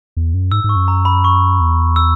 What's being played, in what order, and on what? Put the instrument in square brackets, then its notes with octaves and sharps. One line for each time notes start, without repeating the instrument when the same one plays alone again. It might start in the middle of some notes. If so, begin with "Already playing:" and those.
[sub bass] E2
F#2
[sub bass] G#2 [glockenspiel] E6
[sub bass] G#2
[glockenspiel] C#6
[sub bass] F#2
[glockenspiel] A#5
B5
C#6
[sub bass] E2
[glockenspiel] E6